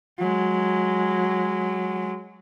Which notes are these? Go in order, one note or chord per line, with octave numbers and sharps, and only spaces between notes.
F#3 G#3